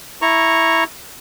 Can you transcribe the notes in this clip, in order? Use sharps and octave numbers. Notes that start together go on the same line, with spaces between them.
E4 A#5 C#6